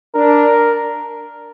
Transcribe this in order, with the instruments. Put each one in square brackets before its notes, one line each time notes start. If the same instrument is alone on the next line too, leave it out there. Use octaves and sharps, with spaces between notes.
[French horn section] D4 [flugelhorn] A#4